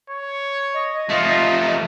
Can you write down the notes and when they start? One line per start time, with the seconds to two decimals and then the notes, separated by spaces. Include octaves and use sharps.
0.10 C#5
0.74 D#5
1.09 F3 A3 F4